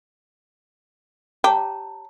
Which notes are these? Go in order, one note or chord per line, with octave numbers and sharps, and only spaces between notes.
G4 C#5 A5 A#5